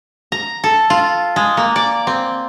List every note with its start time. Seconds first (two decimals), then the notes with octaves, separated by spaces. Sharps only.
0.32 A#5
0.64 A4
0.90 F4
1.36 G#3
1.57 A#3
1.76 D5
2.07 C4